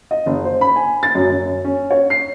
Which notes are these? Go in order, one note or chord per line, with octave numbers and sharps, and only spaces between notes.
D#5
F#1
C5
B5
G#5
A6
F#2
F#2
C#4
C#5
C7